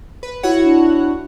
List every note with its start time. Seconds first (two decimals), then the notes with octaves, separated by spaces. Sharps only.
0.23 B4
0.43 E4 F#4 C#5 F#5
0.64 D4